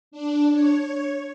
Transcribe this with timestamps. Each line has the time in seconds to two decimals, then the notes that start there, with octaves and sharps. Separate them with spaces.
0.11 D4
0.52 C#5